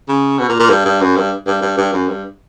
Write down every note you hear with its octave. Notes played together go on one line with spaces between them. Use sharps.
C#3
B2
A#2
A#2
G2
G2
F#2
G2
G2
G2
G2
F#2
G2